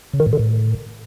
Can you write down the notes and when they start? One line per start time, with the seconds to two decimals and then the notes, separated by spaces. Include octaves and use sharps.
0.13 C#3
0.20 D#3
0.26 A2
0.33 D3
0.39 A2